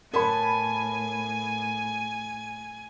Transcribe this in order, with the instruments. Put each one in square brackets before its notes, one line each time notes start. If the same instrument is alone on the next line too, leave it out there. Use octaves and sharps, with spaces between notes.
[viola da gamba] A2 [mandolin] B3 C#5 A5 [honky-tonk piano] A#4 B5 [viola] G#5